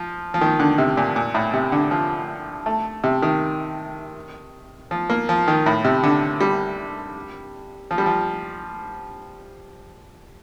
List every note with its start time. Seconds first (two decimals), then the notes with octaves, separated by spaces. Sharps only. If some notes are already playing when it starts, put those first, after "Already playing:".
Already playing: F3
0.34 F3
0.41 D#3
0.60 D3
0.78 C3
0.97 A#2
1.16 A#2
1.34 A2
1.53 C3
1.72 D3
1.91 F3
2.66 A3
3.04 C3
3.22 D#3
4.91 F3
5.10 A#3
5.29 F3
5.48 D#3
5.66 A2
5.85 C3
6.03 D3
6.41 G3
7.91 F3
7.98 G3
8.06 F3